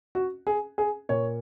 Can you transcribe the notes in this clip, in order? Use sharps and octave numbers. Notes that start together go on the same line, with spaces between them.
F#4
G#4
G#4
A#2 A#3 C#5